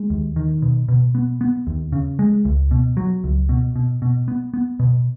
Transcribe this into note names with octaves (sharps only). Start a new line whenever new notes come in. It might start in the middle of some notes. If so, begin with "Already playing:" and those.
Already playing: G#3
D#2
D#3
B2
B2
B3
B3
D#2
C#3
G#3
C#2
B2
F#3
C#2
B2
B2
B2
B3
B3
B2